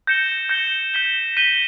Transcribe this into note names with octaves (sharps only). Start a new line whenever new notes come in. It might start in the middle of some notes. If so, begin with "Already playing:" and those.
G6 A#6 C#7 E7 G7
G6 A#6 C#7 E7 G7
G6 B6 D#7 G7
G6 B6 D#7 G7